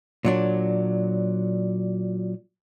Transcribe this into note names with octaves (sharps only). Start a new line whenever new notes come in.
A#2 F#3 D4